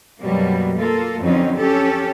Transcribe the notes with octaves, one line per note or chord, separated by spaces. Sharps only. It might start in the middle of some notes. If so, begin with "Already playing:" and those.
F#2 B2 F#3 G3 A#3
A#3 F4 A4
F2 D3 F#3 C4 C#4 D#4
C#4 G4 A4